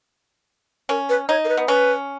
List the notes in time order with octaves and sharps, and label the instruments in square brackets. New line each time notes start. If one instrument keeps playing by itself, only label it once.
[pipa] C#4 [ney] A#4
[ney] B4
[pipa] D#4 [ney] C#5
[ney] A#4
B4
[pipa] B3
[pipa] C#4 [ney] B4